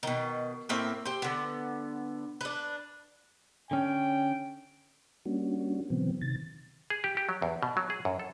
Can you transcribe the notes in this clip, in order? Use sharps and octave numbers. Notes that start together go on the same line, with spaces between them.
B2 D#3
A2 A#3 C4 E5
G4 C5
D3 B3
D4 B4
D3 C#4 G5
G3 A#3 C#4 D4 F#4
B2 D3 E3 F#3 B3 C4
C3 D#3 A6
G#4
G4
G4
F#3
E2
B2
F#3
G#4
F#2
A4